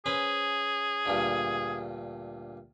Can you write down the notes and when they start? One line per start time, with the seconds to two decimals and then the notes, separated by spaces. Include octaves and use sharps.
0.06 C#4 G#4 B4 C5
1.06 D2 G2 A#2